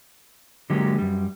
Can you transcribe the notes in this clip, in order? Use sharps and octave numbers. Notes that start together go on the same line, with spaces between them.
D3 F#3 G#3 A#3 G4
F#2 G3